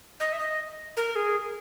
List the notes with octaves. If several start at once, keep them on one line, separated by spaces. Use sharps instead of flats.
D#5
E5
D#5
A#4
G#4